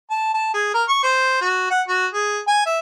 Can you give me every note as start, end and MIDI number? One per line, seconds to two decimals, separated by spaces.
0.10 0.30 81
0.34 0.52 81
0.54 0.70 68
0.74 0.83 70
0.89 1.02 85
1.03 1.41 72
1.41 1.70 66
1.70 1.82 78
1.88 2.07 66
2.13 2.39 68
2.48 2.65 80
2.66 2.80 76